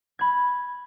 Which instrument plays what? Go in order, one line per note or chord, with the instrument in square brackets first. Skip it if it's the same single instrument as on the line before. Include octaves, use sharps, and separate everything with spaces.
[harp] B5 G#6